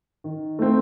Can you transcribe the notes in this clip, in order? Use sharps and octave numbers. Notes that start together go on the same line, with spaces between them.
D#3
A3 C4